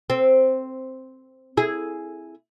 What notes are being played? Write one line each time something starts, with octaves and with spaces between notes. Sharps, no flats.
C4
E4 G#4